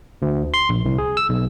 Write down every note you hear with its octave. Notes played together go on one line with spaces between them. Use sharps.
D2
C6
A#1
C2
G#4
E6
B1